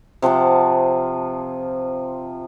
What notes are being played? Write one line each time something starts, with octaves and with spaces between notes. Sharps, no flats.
C3 F3 F#5 A5